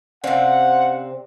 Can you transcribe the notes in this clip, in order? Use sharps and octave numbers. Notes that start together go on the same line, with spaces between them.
C3 C4 C#4 C5 D5 F5 F#5